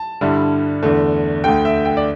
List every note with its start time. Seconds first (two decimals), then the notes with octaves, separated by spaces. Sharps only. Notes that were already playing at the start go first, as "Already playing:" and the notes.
Already playing: A5
0.21 G2 D3 G3 E4
0.82 E2 D3 A3
1.44 D2 D3 A3 G5
1.65 E5
1.85 G5
1.97 D5